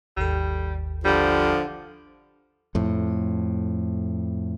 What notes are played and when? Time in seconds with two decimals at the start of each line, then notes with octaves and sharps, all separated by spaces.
0.17 G#1 D#2 G3 A4
1.05 D3 F3 G3
2.75 F2 A2